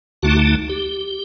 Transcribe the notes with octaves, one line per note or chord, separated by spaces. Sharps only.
D2 D3 A3 D#4 F#4
G4